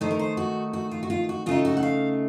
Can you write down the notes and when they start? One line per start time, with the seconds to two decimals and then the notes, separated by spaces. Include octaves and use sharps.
0.01 D#3 A3 D#4 C5
0.11 A#4
0.19 C5
0.37 F#4
0.73 F#4
0.91 F4
1.03 F#4
1.10 F4
1.29 F#4
1.46 C#3 A3 D#4 F4
1.65 F#4
1.77 F#5
1.83 F5